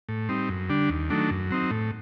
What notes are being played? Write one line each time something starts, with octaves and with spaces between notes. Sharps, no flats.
A2
G3 C4 D#4
F#2
D3 G3 D4
D#2
D#3 F#3 A3 D4
F#2
F#3 C4 D#4
A2